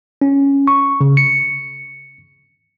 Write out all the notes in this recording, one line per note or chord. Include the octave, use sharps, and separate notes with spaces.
C#4
C#6
C#3
C#7